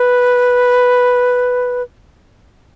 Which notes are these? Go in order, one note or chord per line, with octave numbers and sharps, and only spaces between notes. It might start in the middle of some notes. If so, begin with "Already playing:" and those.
Already playing: B4